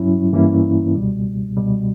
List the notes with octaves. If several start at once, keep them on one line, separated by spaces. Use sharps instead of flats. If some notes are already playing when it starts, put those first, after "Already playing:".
Already playing: G2 F#3 C#4 E4
G2 E3 A#3 C#4 E4
C#2 B2 G3
C#2 B2 G3